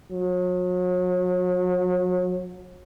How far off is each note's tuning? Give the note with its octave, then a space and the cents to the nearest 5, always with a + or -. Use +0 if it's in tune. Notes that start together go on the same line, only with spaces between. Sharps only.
F#3 -40